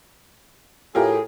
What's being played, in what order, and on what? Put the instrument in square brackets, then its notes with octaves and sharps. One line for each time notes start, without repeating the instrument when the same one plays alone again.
[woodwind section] A2 [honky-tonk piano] F4 G4 A#4 [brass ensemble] G#4